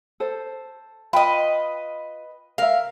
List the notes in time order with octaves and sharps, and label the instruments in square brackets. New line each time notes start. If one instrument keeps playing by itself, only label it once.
[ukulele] A4 C5
[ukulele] F4 G5 B5 [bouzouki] B4 D#5
[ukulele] A#4 E5 [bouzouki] F5